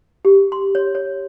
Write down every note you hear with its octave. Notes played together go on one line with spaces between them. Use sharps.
G4
C6
C#5
C#5